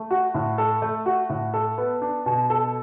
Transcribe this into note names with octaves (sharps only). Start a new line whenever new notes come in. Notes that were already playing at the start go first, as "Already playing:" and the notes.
Already playing: A3
F#4
A2
A4
A3
F#4
A2
A4
B3
D4
B2
A4